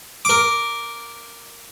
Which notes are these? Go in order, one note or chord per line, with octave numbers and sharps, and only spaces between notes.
A#4 D6